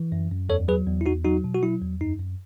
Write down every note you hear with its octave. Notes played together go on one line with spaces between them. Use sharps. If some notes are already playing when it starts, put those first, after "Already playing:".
Already playing: E3
F#2
F#2
E2 A4 C#5
F#3 G#4 B4
E2
E4
E2 D#4 F#4
F#3 D#4 F#4
B2
F#4
F#3 E4
E2
F#2 D#4
F#2